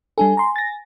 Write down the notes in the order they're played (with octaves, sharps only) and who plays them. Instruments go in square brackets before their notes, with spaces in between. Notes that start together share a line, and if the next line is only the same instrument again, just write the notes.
[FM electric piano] G3 D4 A4 [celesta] G#5
[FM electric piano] A#5 C6
A6 A#6